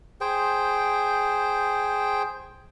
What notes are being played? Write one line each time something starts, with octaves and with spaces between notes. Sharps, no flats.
G#4 C5 G5